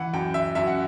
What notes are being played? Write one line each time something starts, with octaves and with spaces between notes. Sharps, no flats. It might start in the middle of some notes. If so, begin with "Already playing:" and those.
Already playing: E3 F#5
F#2 G5
E5
F#2 E5
F#5